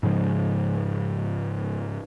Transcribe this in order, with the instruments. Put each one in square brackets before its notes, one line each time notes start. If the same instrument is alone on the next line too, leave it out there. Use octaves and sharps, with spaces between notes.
[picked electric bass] G#2 C#3 F3 G#3